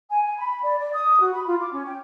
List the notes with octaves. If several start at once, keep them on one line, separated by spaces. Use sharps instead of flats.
G#5
G#5
B5
D5
D5
D#6
F#4
B5
F4
D6
C#4
G5